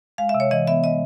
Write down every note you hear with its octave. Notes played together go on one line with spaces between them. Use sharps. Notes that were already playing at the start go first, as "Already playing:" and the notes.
G#3 F5
E5
C3
C#5
E3 D#5
B3 E5
G#3 D#5